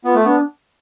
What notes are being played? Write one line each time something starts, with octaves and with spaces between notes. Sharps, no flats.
B3 F4
A3
B3 D4